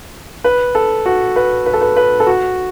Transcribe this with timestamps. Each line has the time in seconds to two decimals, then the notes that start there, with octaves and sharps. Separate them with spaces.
0.44 B4
0.75 A4
1.06 F#4
1.36 B4
1.66 B4
1.73 A4
1.81 B4
1.96 B4
2.20 A4
2.27 F#4